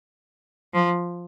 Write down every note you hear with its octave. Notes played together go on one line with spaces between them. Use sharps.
F3